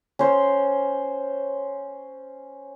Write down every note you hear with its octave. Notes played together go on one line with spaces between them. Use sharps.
C#4 C5